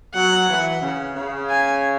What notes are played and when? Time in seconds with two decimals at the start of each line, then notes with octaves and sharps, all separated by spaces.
0.14 F#3 F#5
0.48 E3
0.82 C#3
1.16 C#3
1.50 G#5